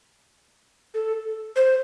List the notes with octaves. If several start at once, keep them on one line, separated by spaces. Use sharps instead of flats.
A4
C5